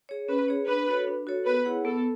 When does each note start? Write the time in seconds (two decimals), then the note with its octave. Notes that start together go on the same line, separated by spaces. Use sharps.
0.09 G#4 C#5
0.28 C#4 B4
0.48 G#4 C#5
0.68 D4 B4
0.88 F#4 A4 C#5
1.07 D4
1.27 F#4 A4 C#5
1.46 B3 B4
1.65 E4 G#4 C#5 F#5
1.85 B3 A4